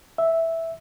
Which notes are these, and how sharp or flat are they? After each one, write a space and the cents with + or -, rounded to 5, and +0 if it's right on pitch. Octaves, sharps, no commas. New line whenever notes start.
E5 -5